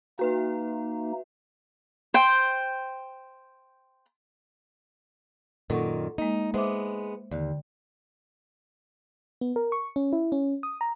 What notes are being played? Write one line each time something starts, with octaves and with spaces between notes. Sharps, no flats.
A#3 D#4 F#4 B4 E5
C5 G5
F#2 A#2 D#3 A4 F#5 C#6
G#3 A#3 D#4
G#3 B3 C5 E5 D6
D#2 D3 D5
B3
A#4
C#6
C#4
E4
C#4
D#6
A#5